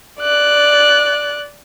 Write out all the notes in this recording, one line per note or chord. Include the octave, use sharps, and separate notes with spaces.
D5 F#6